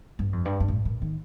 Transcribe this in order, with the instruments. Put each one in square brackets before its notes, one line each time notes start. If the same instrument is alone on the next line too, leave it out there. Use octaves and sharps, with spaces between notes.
[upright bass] G2
F2
G2
G2
A2
A#2
D#3